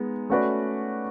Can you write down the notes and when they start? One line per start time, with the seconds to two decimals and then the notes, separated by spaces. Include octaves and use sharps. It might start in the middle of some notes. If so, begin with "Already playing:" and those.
Already playing: G#3 B3 D#4
0.30 A3 C#4 F#4 B4 D5